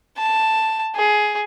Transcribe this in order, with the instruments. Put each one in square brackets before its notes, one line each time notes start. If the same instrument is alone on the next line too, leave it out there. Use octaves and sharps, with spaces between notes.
[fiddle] A5
G#4